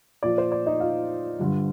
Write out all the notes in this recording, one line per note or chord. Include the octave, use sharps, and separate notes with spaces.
A#2 F3 D5
C5
D5
D#4 D#5
F4 F5
G2 D3 G3